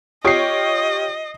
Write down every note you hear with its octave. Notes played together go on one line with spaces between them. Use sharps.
F4 G4 C#5 D#5 D#6 C7